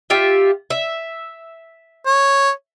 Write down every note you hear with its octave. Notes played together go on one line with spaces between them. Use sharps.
F4 G4 E5
E5
C#5